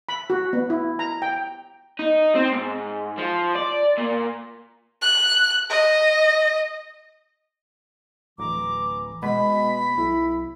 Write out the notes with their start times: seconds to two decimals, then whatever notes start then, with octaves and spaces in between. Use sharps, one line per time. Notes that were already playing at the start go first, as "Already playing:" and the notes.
0.09 B5
0.30 F#4
0.53 B3
0.70 E4
0.99 A#5
1.22 G5
1.99 D#4
2.35 C4
2.52 G#2
3.18 F3
3.55 D5
3.98 A#2
5.02 F#6
5.70 D#5
8.38 D1 E3 A#5 D6
9.22 B2 G#3 B5
9.97 B1 E4